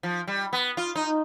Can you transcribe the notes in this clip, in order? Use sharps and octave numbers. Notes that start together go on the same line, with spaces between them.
F3
G3
B3
F4
D#4